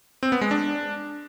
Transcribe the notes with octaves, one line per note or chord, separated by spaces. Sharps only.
C4
B3
G#3
D4